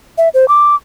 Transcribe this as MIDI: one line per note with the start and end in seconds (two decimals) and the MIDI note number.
0.18 0.29 76
0.34 0.48 72
0.48 0.75 86